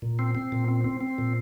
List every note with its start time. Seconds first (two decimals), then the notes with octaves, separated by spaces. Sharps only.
0.02 A#2
0.19 C4
0.35 C4
0.52 A#2
0.68 C4
0.84 C4
1.01 C4
1.18 A#2